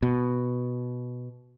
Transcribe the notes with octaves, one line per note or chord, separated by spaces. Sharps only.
B2